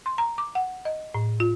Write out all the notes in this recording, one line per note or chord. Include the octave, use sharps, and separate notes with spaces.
C6
A#5
D6
F#5
D#5
A2
F4